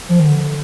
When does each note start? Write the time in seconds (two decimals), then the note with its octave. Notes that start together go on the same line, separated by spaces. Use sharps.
0.09 F3
0.20 D#3
0.25 D3